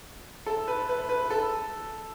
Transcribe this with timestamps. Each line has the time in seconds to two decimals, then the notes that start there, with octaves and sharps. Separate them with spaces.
0.46 A4
0.68 B4
0.89 B4
1.09 B4
1.30 A4